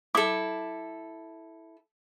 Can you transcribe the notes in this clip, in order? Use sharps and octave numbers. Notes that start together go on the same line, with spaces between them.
E4 A4 D6